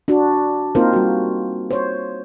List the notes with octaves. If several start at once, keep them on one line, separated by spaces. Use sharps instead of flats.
D4 F#4
A#3 C4 D#4 F4 A#4 C5
G3 F#4
C5 C#5